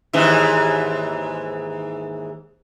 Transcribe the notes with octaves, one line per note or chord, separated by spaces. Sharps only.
D#2 G#2 E3